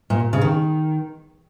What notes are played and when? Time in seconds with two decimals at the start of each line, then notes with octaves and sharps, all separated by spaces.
0.10 A#2
0.33 C#3
0.41 D#3